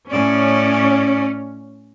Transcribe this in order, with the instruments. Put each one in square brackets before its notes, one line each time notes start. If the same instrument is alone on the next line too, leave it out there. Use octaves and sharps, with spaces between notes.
[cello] A2 D5 [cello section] C#4